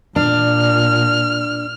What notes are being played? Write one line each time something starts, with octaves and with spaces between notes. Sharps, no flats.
A#2 D4 F6